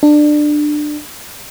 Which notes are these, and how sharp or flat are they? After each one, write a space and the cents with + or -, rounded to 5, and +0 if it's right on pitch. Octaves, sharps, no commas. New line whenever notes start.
D4 +20